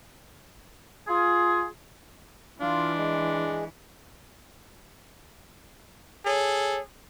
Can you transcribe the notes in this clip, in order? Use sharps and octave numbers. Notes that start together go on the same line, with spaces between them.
F4 G#4
E3 D4 F4
G#3
G#4 A4 C#5